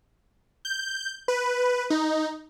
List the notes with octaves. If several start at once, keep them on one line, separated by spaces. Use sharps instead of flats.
G6
B4
D#4